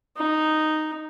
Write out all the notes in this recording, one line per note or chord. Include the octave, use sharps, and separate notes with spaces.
D#4